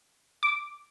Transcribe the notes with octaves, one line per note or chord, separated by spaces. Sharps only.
D6